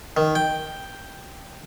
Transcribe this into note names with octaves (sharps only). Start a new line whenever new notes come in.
D#3
G5